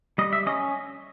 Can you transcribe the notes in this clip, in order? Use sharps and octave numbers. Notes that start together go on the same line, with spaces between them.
G3 D#5
E5
C#4 D#5